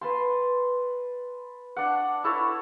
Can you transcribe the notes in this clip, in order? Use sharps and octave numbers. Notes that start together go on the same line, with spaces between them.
B4 A5 C6
D4 F#5
E4 A4 C#5